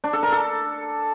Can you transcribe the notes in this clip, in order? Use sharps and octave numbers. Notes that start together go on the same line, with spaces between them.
D4
A4
A#4
A4